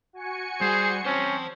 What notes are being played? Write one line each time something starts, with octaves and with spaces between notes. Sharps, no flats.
F#4 G#5 C#7
G3 G#4 C5
C4 C#4 C5 A5